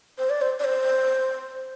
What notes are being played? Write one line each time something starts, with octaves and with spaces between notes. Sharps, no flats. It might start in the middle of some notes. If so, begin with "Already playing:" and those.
C5
D5
C5
D5
C5